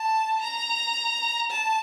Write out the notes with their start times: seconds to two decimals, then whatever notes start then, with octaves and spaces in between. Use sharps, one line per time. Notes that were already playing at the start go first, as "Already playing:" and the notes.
Already playing: A5
0.41 A#5
1.50 A5